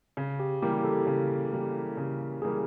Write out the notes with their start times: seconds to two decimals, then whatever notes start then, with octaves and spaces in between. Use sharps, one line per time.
0.17 C#3
0.40 G4
0.62 E3 G3 A#3 G4
0.85 A4
1.07 C#3
1.51 E3 G3 A#3
1.97 C#3
2.42 E3 G3 A#3 G#4